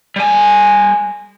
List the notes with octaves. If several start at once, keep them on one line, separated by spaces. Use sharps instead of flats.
G3 G#5